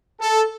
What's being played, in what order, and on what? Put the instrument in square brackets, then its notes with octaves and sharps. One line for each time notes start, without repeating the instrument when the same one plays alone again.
[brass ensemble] A4